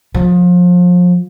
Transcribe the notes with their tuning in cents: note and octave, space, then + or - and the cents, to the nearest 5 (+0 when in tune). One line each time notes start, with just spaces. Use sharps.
F3 +30